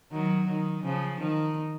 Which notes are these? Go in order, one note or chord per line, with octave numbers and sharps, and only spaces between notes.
D#3 F#3
D#3
C#3 F3
D#3